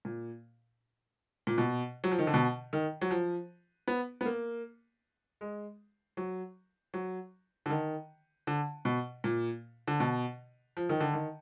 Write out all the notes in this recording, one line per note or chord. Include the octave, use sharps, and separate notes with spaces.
A#2
A#2
B2
F#3
F3
D#3
D3
B2
D#3
F#3
F3
B3
B3
A#3
G#3
F#3
F#3
D3
D#3
D3
B2
A#2
D3
B2
F3
D#3
D3
D#3